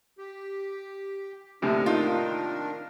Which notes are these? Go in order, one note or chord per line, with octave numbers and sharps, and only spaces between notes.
G4
D#2 A2 C3 D#3 D4 A#4
D#4 F4